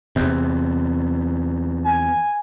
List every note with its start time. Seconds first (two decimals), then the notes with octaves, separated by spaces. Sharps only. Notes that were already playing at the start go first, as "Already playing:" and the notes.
0.16 E2 C3
1.86 G#5